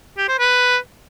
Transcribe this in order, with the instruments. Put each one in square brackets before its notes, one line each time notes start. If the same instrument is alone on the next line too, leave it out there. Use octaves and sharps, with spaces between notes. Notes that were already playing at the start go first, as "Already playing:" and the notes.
[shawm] G4
C5
B4